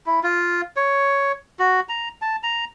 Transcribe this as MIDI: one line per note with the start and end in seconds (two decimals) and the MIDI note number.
0.06 0.20 64
0.23 0.61 65
0.77 1.32 73
1.59 1.80 66
1.89 2.09 82
2.22 2.36 81
2.43 2.65 82